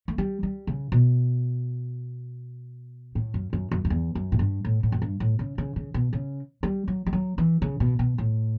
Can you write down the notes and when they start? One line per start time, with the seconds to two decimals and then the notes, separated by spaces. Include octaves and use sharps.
0.08 A3
0.18 G3
0.43 G3
0.67 C#3
0.92 B2
3.15 A2
3.34 F#2
3.53 F#2
3.71 F#2
3.85 F#2
3.90 E2
4.15 F#2
4.32 A2
4.39 G2
4.65 A2
4.83 A2
4.92 F#2
5.02 G2
5.20 A2
5.39 C#3
5.58 C#3
5.76 C#3
5.94 B2
6.13 C#3
6.63 G3
6.88 F#3
7.07 G3
7.13 F#3
7.38 E3
7.62 C#3
7.80 B2
7.99 B2
8.18 A2